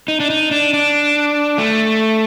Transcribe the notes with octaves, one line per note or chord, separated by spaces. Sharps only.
D#4
D4
D#4
D4
D4
A3